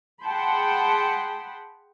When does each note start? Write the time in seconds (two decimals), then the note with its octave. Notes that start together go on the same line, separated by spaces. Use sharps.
0.23 G#4 F#5 G5 A5 B5 C6